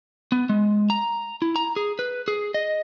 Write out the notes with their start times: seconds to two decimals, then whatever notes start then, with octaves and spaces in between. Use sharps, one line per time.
0.32 B3
0.49 G#3
0.90 A#5
1.42 E4
1.56 A#5
1.76 G#4
1.99 B4
2.28 G#4
2.54 D#5